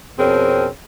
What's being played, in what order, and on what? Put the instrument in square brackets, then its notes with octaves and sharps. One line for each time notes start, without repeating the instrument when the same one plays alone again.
[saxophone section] F2 B2 C4 C#4 G#4 A#4